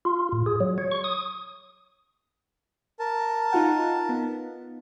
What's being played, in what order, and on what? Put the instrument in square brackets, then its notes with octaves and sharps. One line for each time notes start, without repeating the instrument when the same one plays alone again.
[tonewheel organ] F4
A2
G#4
F#3
C#5
C#6
D#6
[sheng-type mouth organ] A#4 A5
[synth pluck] D#4 F4 F#5
B3